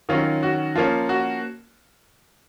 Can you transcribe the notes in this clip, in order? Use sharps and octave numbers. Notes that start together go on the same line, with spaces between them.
D#3 F#3 C#4 F4
F#4
F3 A#3 C#4 F4
F#4